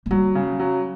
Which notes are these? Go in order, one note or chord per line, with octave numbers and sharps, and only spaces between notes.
A#3
F#3 G3
C#3
F#3